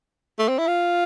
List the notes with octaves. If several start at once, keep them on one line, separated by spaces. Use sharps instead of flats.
A3
C4
E4
F4